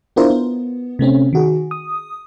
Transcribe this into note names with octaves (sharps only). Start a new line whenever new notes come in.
B3 D4 E4 F4 A#4 C5
B3
C3 A3 C4 C#4
D#3 F#4 G#4
D#6